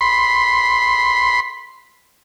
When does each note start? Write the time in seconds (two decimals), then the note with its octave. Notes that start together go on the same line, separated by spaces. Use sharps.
0.01 B5 C6